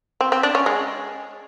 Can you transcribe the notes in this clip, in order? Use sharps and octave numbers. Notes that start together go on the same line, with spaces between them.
C4
C4
D4
C#4
G#3